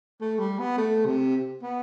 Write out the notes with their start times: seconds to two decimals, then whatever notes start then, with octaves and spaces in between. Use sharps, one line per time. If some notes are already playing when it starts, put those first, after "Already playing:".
0.21 A3
0.39 G3
0.59 B3
0.78 A3
1.06 C3
1.62 B3